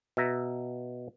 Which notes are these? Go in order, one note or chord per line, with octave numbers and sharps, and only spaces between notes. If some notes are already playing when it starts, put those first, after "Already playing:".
B2 E5 A#5